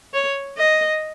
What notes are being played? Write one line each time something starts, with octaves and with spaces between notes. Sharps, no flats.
C#5
D#5